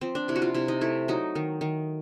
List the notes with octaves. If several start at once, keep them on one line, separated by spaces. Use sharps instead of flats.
F3 C4
D4
C3 E4
F#4
F4
C3 E4
D#4
A3 E4
F#3 D#4
D#3
D#3